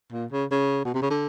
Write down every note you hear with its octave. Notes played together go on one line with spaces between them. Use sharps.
A#2
C#3
C#3
B2
C3
C#3
D3